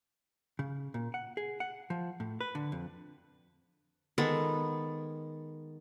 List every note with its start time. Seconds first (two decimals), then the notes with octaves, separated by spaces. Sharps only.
0.59 C#3
0.94 A#2
1.14 F#5
1.37 G#4
1.60 F#5
1.90 F3
2.20 A2
2.41 B4
2.55 D3
2.72 F2
4.18 D#3 G#3 B3 A4